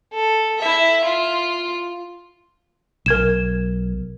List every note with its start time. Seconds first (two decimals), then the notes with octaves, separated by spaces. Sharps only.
0.13 A4
0.58 E4 E5
1.04 F4
3.06 B1 A#4 G#6 E7